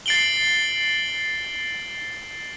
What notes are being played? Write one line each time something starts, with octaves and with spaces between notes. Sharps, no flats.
A6 C7 D7 F#7 G7